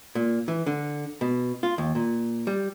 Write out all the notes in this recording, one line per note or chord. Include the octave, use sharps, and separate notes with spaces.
A#2
E3
D3
B2
F4
D#2
A#2
G3